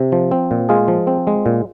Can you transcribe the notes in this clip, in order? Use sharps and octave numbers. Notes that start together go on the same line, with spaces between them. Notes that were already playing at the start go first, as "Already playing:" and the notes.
Already playing: C3
F3
C4
A#2
G#3 F4 G#4
F3
C4
G#3
A#2